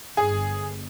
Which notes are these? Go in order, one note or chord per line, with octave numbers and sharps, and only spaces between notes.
G1 G#4